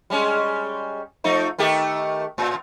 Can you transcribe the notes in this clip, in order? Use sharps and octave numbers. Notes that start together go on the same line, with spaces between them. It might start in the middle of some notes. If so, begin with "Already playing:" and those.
G3 G#3 C#4
F3 A3 D#4
D#3 A3 G4
A2